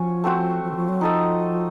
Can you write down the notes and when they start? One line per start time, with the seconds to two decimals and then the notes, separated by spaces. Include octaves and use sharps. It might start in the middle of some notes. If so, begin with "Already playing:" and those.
Already playing: F3 C#4 F#4
0.24 A3 C4 F#4 C5
0.64 F3
0.71 D#3
0.76 F3
0.89 F#3
1.01 F3 D#4 A4 D#5